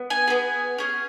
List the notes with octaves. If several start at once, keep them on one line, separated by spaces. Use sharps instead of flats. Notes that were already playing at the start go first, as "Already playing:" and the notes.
Already playing: B3
G#5
B3 G#4
C#4 G#4